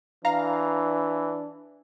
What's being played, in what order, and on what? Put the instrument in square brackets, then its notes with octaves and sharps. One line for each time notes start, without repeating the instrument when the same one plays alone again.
[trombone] E3 [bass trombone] D4 [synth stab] F5 A#5